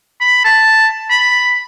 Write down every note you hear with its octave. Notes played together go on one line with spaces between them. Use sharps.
B5
A5
B5